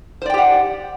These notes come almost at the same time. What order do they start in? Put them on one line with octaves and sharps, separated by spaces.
C5 D5 G5 G4 F#5